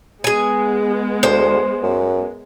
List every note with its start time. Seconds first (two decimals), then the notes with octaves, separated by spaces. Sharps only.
0.24 G#3 B3 G#4 G#5
1.23 D2 C5
1.83 F#2